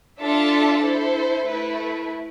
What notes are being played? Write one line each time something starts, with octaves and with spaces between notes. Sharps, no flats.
D4 F4 A4 E5 A5
E4 A4 C5
A3 E4 B4